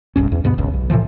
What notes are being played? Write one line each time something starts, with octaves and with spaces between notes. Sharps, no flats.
E1 B1 G2 C#4
E2
D2 G2 B2 B3
G1 C#2
B1
A2 C3 E3 F3